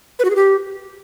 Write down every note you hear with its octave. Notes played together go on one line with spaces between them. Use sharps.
B4
F#4
G#4
G4